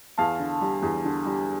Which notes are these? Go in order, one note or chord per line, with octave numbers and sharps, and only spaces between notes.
E2 F5 A5
D3
G3
E2
D3
G3